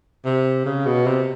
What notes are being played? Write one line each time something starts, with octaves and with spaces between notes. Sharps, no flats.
C3
C#3
B2
C3